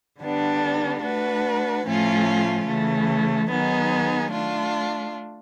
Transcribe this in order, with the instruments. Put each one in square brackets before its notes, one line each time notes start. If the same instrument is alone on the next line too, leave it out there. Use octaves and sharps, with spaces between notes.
[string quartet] D3 G3 B3 D4
A3 D4 F#4 B4
A2 F3 A3 C#4 F4
C#3 E3 A3
D#3 F#3 B3 D#4 G#4
A3 D4 F4